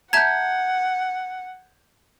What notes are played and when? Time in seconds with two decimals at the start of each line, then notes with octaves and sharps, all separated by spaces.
0.13 E5 F#5 A5 A#5 G6 G#6